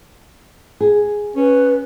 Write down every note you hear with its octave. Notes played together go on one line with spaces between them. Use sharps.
G#4
C#4 B4